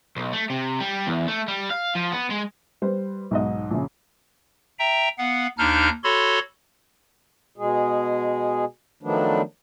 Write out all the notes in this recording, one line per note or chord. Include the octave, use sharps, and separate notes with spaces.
B1
A3
C3
G3
E2
A3
G3
F5
F3
B3
G#3
G3 B4 C5
B1 G#2 D#5
A#1 C#3
E5 G5 A#5
B3 F5 F#5
D#2 D4 D#4 F6 G6
F#4 A4 C#5 B5 C6
B2 G#3 G#4
D#3 F3 F#3 A3 B3 D4